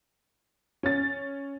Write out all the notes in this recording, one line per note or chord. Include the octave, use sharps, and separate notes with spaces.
C#4 A6